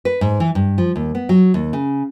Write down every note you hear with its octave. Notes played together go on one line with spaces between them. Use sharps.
B4
G#2
E3
G2
F3
D#2
B3
F#3
D#2
C#3